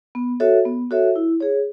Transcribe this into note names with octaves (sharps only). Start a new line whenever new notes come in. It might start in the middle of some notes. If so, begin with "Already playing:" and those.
B3
F#4 A4 C#5 E5
B3
F#4 A4 C#5 E5
E4
G#4 C#5